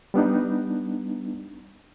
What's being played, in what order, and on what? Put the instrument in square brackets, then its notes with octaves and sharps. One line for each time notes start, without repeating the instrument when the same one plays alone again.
[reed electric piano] G3 B3 D4 D#4